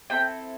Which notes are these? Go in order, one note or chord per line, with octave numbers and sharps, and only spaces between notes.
C4 E4 A4 G5